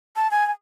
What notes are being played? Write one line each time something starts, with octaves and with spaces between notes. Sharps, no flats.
A5
G#5
G#5